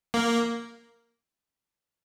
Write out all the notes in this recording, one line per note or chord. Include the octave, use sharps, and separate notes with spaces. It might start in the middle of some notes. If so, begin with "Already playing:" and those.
A#3